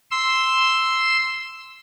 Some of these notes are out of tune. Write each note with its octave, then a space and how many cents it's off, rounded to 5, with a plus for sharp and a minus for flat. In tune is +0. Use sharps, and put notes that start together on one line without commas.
C6 +0 E6 +0